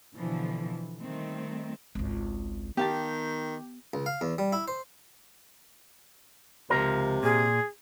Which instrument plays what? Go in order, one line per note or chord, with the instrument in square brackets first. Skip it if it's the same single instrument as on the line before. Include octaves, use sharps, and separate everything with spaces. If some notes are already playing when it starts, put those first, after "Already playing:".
[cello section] B2 D3 E3 F3
D#3 G3 A3 C4
[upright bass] G#1 C#2
[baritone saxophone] D#3 [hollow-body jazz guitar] B3 F5 A5 [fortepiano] G4
[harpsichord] C#2
F5
E2
G3
E4
C5
[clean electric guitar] C#2 F3 A#4 [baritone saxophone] C3
[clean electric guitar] A#2 [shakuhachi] G#4